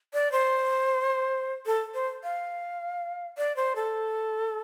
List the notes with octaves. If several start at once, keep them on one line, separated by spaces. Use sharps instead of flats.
D5
C5
A4
C5
F5
D5
C5
A4